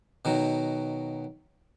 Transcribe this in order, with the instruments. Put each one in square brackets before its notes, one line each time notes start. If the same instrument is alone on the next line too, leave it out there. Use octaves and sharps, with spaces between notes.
[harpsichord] B2 D#3 F#3